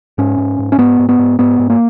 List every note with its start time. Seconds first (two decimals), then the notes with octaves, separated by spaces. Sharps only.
0.18 G#2 C#4
0.38 G#2
0.59 G#2
0.72 C#4
0.78 G#2 B3
0.99 G#2
1.09 B3
1.19 G#2
1.39 G#2 B3
1.59 G#2
1.70 A#3